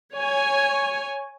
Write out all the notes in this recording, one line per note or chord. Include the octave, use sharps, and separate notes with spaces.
C#5 G#5